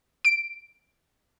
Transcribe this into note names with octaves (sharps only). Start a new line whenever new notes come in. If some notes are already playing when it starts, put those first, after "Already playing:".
D7